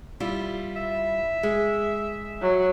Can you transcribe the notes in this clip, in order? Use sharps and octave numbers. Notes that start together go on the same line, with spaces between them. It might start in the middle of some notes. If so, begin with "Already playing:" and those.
G3 E4 F4
E5
G#3
F#3